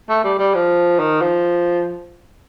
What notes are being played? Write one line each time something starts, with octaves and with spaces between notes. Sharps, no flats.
A3
G3
G3
F3
D#3
F3